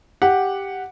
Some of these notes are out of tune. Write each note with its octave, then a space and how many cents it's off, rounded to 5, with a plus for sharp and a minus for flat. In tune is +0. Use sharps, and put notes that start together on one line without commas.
G4 +0 F#5 +0